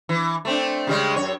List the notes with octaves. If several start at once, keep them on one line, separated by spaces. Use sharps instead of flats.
E3
A3 C4 D4
C#3 G3 G#3
F#2 C#5